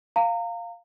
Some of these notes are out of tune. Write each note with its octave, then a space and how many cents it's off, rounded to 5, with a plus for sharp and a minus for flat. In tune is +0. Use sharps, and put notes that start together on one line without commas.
F5 +0 A#5 -30